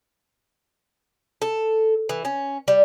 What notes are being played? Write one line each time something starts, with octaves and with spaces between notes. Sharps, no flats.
A4
E3
C#4
G3